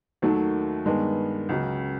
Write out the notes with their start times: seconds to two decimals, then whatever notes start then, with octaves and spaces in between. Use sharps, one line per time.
0.22 D#2 D#3 F#3 A3
0.86 G2 D#3 G#3 B3
1.49 C#2 C#3 F#3